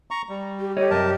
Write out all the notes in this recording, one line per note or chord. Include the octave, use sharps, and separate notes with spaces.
A#5 C#6
G3
G4
G4 A4 C#5 D#5
F#2 C3 A#4 D#5 A5